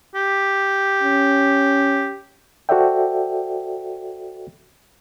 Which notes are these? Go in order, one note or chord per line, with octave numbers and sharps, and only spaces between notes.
G4
C#4
F#4 A4 C5 D5 E5 G5